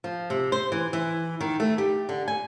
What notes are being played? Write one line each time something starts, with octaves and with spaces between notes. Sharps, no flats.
F3
C3
C5
E3
E3
D#3
A3
G4
D3
G#5